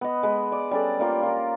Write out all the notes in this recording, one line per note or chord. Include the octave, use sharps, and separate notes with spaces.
B3 D#5
G#3 B4
D5
G3 C#4 A4 D5
G3 A#3 F4
F4 A#4